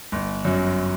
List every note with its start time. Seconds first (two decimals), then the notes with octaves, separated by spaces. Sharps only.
0.12 G1
0.45 F#2 F#3